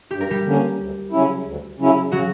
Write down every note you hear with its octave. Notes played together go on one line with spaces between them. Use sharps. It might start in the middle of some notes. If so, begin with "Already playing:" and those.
G2 G4
A#4
G3 G4
D3 A#3 C#4
D2
C#3 F#3 C#4 E4
D2
C#3 F#3 C#4 E4
C#3 F#3 F#4